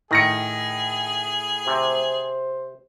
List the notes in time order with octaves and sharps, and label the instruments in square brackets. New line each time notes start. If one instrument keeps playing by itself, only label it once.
[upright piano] A2 A#6 C#7 [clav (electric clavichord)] D#3 [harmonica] G#4
[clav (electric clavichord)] C3 [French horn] C5